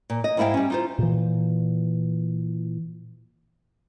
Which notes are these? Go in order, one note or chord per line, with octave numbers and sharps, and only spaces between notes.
A#2
D#5
G#2 G3 E4 E5 F5 G5
G3 C#4
D#4 F4 C5
A#2 E3